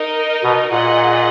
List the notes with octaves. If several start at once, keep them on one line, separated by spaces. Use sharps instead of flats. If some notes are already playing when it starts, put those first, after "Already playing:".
Already playing: D#4 A#4 D#5
B2
A#2 G#4 D#5 F#5